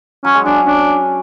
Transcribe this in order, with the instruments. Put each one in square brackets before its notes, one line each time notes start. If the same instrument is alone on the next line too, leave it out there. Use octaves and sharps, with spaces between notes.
[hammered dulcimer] F#3 [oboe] C#4
[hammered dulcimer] G#3
[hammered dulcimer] F#3 [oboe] D4
[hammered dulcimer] C#4 [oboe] D4